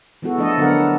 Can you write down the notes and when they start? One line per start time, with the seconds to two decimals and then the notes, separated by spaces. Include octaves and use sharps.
0.22 E3 G#3 B3 F#4 A4
0.38 F3 A3 D4 A4 D#5
0.58 D3 F#3 B3 D4 A#4 F#5
0.78 D4